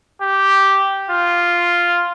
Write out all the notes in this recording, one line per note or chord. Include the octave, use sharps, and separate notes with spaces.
G4
F4